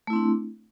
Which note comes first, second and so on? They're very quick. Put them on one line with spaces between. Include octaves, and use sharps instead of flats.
A3 E4 C4 D4